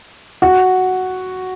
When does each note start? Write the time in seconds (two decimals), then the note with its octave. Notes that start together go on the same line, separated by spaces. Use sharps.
0.42 F#4